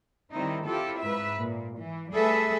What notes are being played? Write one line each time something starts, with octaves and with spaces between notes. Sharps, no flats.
D#3 G3 C4 D#4 E4
C4 E4 F4 G4 A4
G#2 B4 E5
A#2
E3
G3 A3 G#4 A4 B4 E5